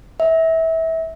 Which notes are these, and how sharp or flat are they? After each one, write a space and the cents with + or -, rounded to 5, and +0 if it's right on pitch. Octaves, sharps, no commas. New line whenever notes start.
E5 -25